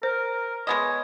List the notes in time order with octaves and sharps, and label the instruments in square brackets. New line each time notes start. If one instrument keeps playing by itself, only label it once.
[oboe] A#4 [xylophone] C5
[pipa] G#3 B3 D#5 [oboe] C#5